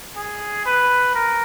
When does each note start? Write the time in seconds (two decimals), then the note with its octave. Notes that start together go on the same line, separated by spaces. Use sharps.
0.16 G#4
0.65 B4
1.14 A#4